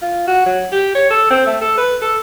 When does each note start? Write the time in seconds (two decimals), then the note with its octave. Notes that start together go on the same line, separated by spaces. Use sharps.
0.02 F4
0.28 F#4
0.46 F#3
0.72 G4
0.95 C#5
1.10 A4
1.30 C4
1.46 A3
1.61 A4
1.78 B4
2.02 A4